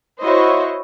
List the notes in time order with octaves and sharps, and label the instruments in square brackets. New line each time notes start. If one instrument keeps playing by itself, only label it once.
[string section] E4 F#4 C5 C#5 D#5